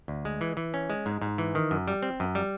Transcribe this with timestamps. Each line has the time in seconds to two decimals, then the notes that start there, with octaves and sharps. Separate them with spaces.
0.08 D2
0.25 G#3
0.41 E3
0.57 E3
0.74 C#4
0.90 G#3
1.06 G#2
1.22 G#2
1.38 E3
1.55 D#3
1.71 F#2
1.88 G3
2.03 C4
2.20 F#2
2.35 G3